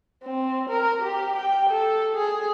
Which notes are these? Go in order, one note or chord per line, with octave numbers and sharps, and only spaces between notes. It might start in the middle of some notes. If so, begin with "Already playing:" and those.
C4
A#4
G4
G5
A4
G#4